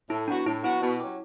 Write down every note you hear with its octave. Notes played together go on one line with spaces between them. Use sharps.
A2 E4
F#3 B3 D4 F#4
A2 E4
F#3 B3 E4 F#4
B2
F#3 C#4 G4